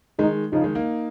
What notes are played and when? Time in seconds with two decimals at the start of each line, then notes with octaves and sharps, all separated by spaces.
0.19 D#3 G#3 D#4
0.52 C#3 F3 D#4
0.64 D#3 G#3
0.75 A#3 D#4